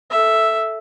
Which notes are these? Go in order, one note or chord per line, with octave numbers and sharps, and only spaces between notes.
A4 E5